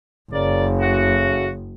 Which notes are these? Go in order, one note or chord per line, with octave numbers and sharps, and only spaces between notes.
F#1 C#3 A#4 D5
A3 F#4